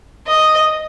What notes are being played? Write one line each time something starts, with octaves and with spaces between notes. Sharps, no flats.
D#5